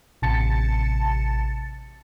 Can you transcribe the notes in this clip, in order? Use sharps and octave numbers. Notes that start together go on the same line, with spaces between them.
A1 C3 A5 A6 C#7